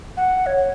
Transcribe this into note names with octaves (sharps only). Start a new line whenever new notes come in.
F#5
C#5